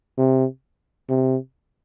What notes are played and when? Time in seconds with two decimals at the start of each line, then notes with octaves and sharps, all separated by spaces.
0.18 C3
1.09 C3